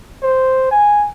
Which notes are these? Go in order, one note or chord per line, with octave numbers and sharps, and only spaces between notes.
C5
G#5